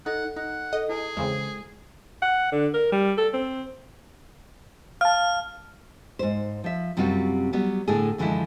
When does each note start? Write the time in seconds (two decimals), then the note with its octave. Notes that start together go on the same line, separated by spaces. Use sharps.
0.06 D#4 A4 D#5 F#5
0.36 D#4 F#5
0.73 A4 D#5
0.89 E4 G#4 B4 G#5
1.17 E2 C#3 G#3 C4
2.22 F#5
2.52 D3
2.74 A#4
2.92 G3
3.17 A4
3.33 C4
5.01 F5 A5 F6
6.19 G#2 C5
6.64 F3 E5
6.97 F#2 C3 G3 C4 F4 F#4
7.53 F#3 G3 B3
7.88 A2 D3 G#4
8.18 F#2 D3 E3 F3 G#3 E4